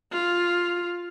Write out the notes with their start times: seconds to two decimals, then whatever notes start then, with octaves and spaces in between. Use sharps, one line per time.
0.12 F4